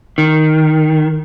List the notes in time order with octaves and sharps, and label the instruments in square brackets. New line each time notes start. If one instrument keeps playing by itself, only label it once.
[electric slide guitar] D#3